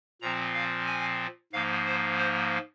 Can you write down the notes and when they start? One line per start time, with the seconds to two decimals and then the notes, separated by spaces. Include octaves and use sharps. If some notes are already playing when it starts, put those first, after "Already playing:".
0.22 A#2 F3 C4 A#5
0.54 F5
0.87 G#5
1.52 G#2 F3 A#3 F5
1.86 C5
2.18 C5